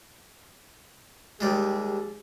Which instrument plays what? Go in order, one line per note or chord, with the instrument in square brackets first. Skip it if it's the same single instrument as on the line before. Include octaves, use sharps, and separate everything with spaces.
[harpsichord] D#2 G3 G#3 [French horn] G#4